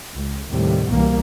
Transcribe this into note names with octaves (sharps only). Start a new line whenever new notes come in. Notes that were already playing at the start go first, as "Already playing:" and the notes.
C#2
D#2 A2 C3 G3
C2 B2 E3 G3 A#3